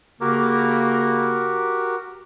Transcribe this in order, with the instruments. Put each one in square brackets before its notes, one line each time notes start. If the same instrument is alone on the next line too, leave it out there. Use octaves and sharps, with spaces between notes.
[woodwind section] C#3 A#3 [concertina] F#4 G4 A#4